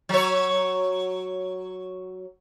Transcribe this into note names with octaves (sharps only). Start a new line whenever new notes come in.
F#3 C#5